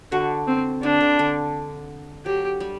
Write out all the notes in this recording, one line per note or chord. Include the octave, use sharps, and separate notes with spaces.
D3 F#4
C4
D3 D4
D3
D3
F#3 G4
G3